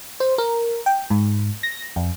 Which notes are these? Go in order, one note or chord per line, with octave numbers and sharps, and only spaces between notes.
C5
A#4
G5
G#2
A#6
F2